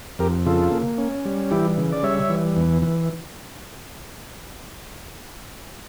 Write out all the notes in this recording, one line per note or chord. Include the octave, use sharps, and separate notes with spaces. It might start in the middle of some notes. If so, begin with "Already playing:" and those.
F2 G4 A#4
C#3 F4 A4
A#3
C#4
G3
E3 E4 G4
C#3
D5
G3 C#5 E5
E3
E2
E3